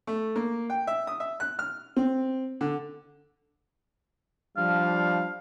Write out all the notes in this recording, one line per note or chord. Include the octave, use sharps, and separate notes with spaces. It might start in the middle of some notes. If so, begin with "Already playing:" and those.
A3
A#3
G5
E5
D#6
E5
F#6
F6
C4
D3
F3 G3 D4 F5